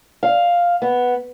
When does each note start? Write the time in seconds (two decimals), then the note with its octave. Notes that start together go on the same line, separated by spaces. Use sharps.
0.23 F5
0.82 B3